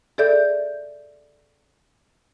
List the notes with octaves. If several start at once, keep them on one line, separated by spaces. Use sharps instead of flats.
G#4 A4 D5 E5 G6